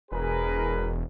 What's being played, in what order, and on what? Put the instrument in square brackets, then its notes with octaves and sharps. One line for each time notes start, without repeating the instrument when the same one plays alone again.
[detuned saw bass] E1 [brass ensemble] G#4 A#4 B4